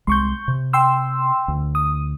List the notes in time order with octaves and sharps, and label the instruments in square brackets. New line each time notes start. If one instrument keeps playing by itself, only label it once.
[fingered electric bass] C2 G#3 [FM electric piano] C6 C#6 G6
[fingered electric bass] C3
[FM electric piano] G5 C6 E6
[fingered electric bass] D2
[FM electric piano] D#6